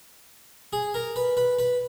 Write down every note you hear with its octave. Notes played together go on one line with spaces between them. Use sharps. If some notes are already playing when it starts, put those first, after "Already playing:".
G#4
A#4
B4
B4
B4